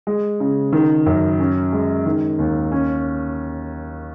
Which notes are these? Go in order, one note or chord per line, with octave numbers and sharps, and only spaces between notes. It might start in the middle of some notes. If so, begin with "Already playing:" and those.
G#3
C#3
D#3
F#2
C#4
G#3
D#3
D#2
C#4